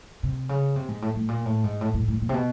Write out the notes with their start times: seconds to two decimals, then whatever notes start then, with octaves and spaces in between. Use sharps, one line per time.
0.23 C3
0.49 C#3
0.76 C3
0.88 G#2
1.02 A2
1.15 A2
1.28 A#2
1.46 A2
1.64 G#2
1.81 A2
1.94 A2
2.08 A2
2.21 A#2
2.29 C3
2.34 B2